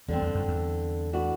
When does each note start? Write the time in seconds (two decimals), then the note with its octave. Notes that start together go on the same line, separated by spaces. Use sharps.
0.08 E2 D3 G3 C4
0.22 E2
0.35 F#2
0.48 E2
1.13 E3 A3 D4 F#4